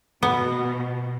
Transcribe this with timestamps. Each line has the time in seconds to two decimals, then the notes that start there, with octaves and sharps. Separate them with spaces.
0.23 B2 B3